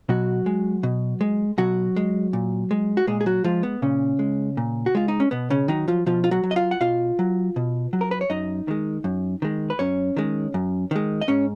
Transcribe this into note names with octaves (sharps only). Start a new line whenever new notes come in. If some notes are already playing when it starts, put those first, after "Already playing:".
B2 F#3 F#4
G#3
B2
G#3
B2 F#3 F#4
G#3
A#2
G#3
F#4
A#2 G#3 G#4
G#4
F#3 F#4
F3 G#3 F4
B3
A#2 C#3 C#4
G#3
A#2
F#4
G#3 F4
D#4
C#4
B2 B3
C#3 C#4
D#3 F#3 D#4
F3 F4
B2 F3 F4
F4
F#3 F#4
F#3
D#5
F4 F5
F#5
B2 F4 F5
F#3
B2
F#3
A#4
B4
C#5
F#2 D#4 D#5
D#3 G#3
F#2
D#3 G#3
B4
F#2 C#4 C#5
D#3 G#3
F#2
D#3 G#3
D#5
G#2 C#4 C#5